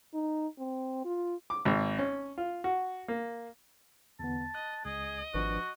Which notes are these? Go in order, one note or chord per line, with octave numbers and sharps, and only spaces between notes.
D#4
C4
F4
D6
G#1
C#4
F4
F#4
A#3
E2 D3 B3 A5
D#5 F#6
C#2 G#4 D#5
G#1 F3 D4 F#4 B4